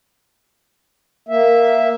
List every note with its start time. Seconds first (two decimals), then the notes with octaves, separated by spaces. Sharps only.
1.29 A#3 E5